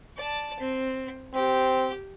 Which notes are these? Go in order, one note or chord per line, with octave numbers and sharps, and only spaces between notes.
D5 A5
C4
C4 G4